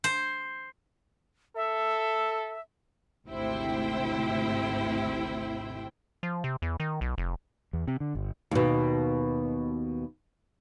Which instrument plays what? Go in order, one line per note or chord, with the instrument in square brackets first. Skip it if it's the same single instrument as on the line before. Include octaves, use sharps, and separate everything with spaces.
[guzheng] C5
[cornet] A4 [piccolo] E5
[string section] G#1 D2 C3 E4 C5 G5
[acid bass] F3
C3
E2
D#3
B1
F1
[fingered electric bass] E2
C3
D3
G1
[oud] D#2 B2